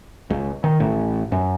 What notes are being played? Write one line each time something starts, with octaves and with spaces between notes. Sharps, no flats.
C#2
D#3
A1
F#2